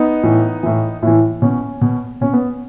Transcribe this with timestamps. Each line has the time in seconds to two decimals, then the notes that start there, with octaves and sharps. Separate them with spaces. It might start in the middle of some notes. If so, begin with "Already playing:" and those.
Already playing: B3 D#4
0.23 A2 E3
0.63 A2 E3
1.02 A2 E3
1.42 B2 C#4
1.81 B2
2.21 B2 C#4
2.33 B3